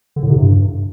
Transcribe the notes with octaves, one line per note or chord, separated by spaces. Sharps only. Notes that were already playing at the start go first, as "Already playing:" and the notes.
D3
A2
C3
G2